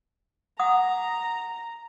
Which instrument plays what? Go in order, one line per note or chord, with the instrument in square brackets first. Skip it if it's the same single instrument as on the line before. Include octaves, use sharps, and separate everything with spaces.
[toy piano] F#5 D#6 [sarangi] A#5